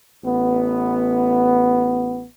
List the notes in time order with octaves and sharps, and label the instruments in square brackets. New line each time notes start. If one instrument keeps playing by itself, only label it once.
[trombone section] A1 B3